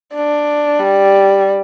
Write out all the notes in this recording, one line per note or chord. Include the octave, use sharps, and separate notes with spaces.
D4
G3